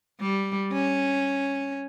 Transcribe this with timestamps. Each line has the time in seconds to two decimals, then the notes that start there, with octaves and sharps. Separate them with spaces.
0.21 G3
0.72 C#4